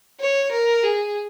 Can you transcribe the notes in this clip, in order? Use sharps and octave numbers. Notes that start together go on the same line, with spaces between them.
C#5
A#4
G#4